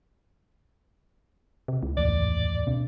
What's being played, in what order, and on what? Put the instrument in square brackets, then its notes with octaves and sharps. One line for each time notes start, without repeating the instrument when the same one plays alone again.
[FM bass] C3
C#2
[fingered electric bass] G#1 E2 A2 [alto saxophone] D5
[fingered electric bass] B2 C4 D4